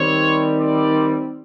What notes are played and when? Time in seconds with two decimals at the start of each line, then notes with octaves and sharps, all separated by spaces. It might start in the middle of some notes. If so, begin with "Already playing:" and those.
Already playing: D#3 G3 C4 C#5
0.60 D5